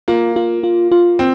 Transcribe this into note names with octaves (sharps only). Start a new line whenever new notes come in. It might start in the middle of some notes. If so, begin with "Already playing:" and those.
A#3 F4
F4
F4
F4
C4